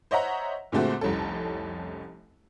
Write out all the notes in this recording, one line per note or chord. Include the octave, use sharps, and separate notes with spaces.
C5 C#5 D#5 E5 F#5 A#5
A#2 D3 G#3 A3 C4 F#4
F1 C2 C#4 A4